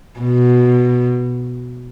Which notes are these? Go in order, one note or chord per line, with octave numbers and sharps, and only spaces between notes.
B2